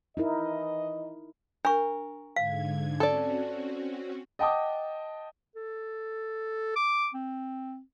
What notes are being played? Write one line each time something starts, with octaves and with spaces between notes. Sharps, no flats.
E3 D#4 E4 A#4 D#5
D4 A#4 C#6
G#2 D3 F5 G#6
C4 C#4 F#4 A4 D5
D#5 F#5 G5 A5 D6 D#6
A4
D6
C4